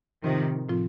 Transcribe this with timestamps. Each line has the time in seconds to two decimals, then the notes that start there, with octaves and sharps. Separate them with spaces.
0.23 A2 C3 D#3 F3 C4 F4
0.69 A2 F3 C4 F4